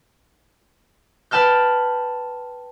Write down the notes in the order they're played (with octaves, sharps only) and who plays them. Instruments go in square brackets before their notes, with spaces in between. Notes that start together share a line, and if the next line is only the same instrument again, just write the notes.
[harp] B4 G5 A5 F6 G6